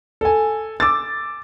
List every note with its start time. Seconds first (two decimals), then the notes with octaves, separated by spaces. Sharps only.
0.21 A4 G#5
0.80 D6 E6 A6